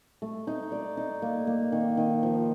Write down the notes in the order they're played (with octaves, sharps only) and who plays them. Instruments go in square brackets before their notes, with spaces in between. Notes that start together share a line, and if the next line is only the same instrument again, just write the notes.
[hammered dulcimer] A3
D#4
D5
D#4
A#3
A#3
D#3
D#3
F3